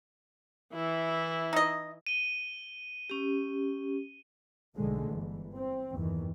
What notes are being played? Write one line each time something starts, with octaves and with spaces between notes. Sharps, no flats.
E3 E4
D#4 D#5
D#7 G7
C#4 G4
B1 G#2 D3 F3 G#3 A3
G1 E3
C4
F#1 E2 G2 D#3 E3